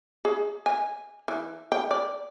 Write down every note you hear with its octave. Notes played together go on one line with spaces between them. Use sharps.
G#4
G#5
E3
G5
D5